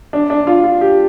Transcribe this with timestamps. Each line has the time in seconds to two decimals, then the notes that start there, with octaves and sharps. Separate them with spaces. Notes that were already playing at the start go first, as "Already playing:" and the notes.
0.13 D4
0.30 D4
0.47 F4
0.64 F4
0.81 G4